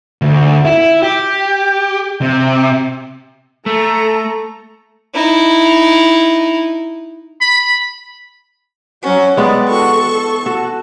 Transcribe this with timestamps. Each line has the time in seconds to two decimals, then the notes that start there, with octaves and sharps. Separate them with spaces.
0.22 D2
0.65 E4
1.03 G4
2.21 C3
3.66 A3 A4 A#5
5.14 D#4 E4
7.41 B5
9.03 F#3 C#4 F#4
9.37 G3 G#3 B3 D5 F#5
9.68 F#4 A4 C#6
9.98 A4
10.46 F#4 A4